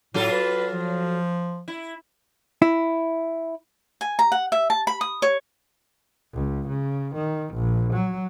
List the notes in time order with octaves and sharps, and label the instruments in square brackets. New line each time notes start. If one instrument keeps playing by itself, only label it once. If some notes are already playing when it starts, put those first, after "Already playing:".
[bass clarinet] A2 [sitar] F#3 F4 A4
[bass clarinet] B4
F3
[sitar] E4
[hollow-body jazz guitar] E4
[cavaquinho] G#5
A#5
F#5
E5
A5
B5
D#6
C#5
[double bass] C#2
C#3
D#3
A#1
F#3